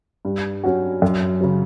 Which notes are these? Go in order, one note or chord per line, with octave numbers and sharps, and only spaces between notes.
G2
F#3 C#4 F#4
F#2
C#3 F#3